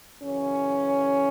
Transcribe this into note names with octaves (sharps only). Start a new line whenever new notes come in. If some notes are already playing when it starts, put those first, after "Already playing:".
F#2 C#3 E3 C#4